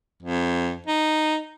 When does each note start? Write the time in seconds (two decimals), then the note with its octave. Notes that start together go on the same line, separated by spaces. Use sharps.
0.23 F2
0.87 D#4